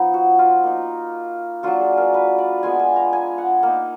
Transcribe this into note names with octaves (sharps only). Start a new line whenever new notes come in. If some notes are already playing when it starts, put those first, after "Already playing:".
Already playing: F3 B3 D#4
F#4
F4
A#3 D#4
F#3 A#3 D4 F4 F#4
G#4
A#4
B4
D5
G#3 B3 F4 G#5
G#5
A#5
G#5
F#5
A#3 D#4